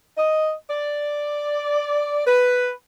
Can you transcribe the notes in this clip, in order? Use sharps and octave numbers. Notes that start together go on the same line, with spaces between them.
D#5
D5
B4